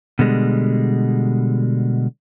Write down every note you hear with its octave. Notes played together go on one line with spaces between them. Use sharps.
B2 D3 G3 G#3